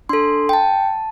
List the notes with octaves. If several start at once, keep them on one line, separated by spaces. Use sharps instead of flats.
D4 A4 C6
G5
A5